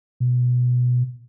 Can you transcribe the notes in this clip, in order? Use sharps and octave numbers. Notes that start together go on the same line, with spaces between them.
B2